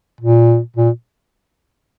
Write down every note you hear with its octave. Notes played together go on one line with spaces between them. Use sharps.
A#2
A#2